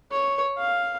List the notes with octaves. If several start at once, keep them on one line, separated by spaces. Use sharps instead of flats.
C#5
F5